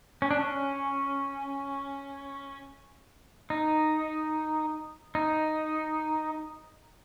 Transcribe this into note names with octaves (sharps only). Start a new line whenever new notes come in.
C#4
D4
C#4
D#4
D#4